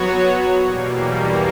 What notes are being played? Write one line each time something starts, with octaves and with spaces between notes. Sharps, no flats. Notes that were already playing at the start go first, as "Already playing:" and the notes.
Already playing: F#3 B3 F#4 C#5
E2 B2 G3 A#3